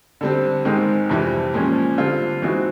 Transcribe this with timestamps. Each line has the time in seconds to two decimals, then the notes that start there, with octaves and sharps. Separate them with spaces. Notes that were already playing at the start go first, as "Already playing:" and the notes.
0.21 D3 G3 C4
0.65 G#2 D#3 G#3 C4 D#4
1.09 F2 C3 E3 G3
1.54 A#2 F3 G#3 C#4
1.98 D3 G3 C4 F4
2.42 E3 G#3 C4 D#4 F#4